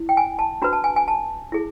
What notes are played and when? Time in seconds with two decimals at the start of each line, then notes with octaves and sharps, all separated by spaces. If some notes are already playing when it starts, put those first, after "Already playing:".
Already playing: E4
0.09 G5
0.17 G#5
0.39 A5
0.62 D4 F#4 B4 A#5
0.73 A5
0.84 G#5
0.96 G#5
1.08 A5
1.52 E4 G#4